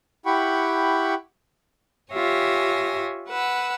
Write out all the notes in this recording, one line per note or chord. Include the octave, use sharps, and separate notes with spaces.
E4 G4 F#5 G5 B5 C#6
F4 G4 C#5 E5 G#5 A#6
B4 F#5 E6